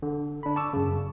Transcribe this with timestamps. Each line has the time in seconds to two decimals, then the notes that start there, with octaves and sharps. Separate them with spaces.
0.02 D3
0.43 D4 B5
0.56 A5 C#6 D6 E6
0.73 F#2 C#3